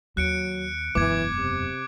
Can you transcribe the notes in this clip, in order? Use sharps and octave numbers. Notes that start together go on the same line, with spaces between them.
D#2 F#3 F#6 C#7 D7
E1 F#2 E3 D6 G#6
C3